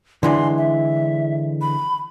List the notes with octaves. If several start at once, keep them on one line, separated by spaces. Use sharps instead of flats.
D3 E3 G#3 C6
E5
B5